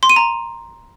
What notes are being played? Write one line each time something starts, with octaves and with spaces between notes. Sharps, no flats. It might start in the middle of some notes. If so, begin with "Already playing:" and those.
C6
D#7
A#5